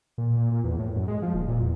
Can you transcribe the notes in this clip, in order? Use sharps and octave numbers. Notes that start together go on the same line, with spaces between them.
A#2
A#2
A#2
E2
A2
F#2
G#3
F3
D#1
A#2
E2